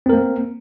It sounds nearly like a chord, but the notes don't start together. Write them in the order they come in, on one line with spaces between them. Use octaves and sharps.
C4 A#4 A#3